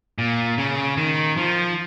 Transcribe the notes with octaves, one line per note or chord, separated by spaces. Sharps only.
A#2
C#3
D#3
F3